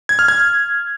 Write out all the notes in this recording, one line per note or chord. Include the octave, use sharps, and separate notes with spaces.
G#6
F6
G#6